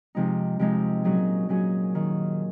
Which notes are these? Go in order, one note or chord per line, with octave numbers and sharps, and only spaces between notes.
C3 F3 G#3 D#4
C3 F3 G#3 D#4
A#2 F#3 C#4 G#4
A#2 F#3 C#4 G#4
D#3